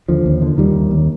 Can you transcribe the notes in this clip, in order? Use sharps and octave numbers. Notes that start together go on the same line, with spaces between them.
D#2 D3 F3
D#2
D3
D#2 D#3 G3
D#2
D#2